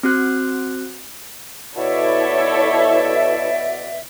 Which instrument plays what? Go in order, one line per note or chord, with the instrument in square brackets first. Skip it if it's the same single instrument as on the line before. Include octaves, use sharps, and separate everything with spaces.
[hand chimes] C4 F#4 F#6
[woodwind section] B2 D5 E5 [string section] E4 A4 C#5